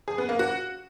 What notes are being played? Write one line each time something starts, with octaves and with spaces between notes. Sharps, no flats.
G#4
B3
A#3
F#4